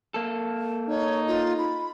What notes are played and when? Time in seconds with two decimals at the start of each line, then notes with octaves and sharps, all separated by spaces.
0.14 A#3 A4
0.89 D#4 C#5
1.27 F4
1.58 B5